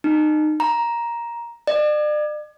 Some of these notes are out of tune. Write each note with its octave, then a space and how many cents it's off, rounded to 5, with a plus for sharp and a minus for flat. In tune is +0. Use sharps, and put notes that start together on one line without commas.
D#4 -30
A#5 +10
D5 +40